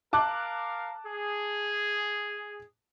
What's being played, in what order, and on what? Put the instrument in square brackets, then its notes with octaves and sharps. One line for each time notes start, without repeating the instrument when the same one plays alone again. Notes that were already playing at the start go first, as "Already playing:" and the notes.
[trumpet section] A#4 F5 [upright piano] A5 D6 F#6
[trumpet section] G#4